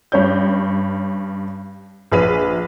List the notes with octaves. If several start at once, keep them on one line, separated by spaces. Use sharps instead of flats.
G2 C#4 G6
A#1 G#4 B4 B6 D#7